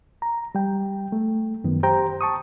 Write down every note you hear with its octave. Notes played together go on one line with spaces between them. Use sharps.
A#5
G3 G5
A3
F#2 D#3 B3
G4 C5 G5 A#5
A5 C#6 D#6